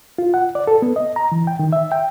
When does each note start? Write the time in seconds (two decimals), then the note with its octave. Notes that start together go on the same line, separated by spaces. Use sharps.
0.18 F4
0.34 F#5
0.55 D5
0.67 A4
0.82 B3
0.96 D#5
1.16 A#5
1.32 E3
1.47 G5
1.59 D#3
1.73 E5
1.92 G5